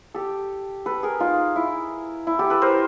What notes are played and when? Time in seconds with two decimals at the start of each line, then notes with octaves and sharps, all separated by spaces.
0.14 G4 A4
0.86 A4 B4
1.03 G#4 A#4
1.20 D#4 F4
1.56 E4
2.27 E4
2.39 G4 A4
2.50 A4 B4
2.62 A#4 C5